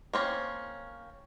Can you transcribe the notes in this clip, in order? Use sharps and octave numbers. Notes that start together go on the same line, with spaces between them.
A#3 C4 C#4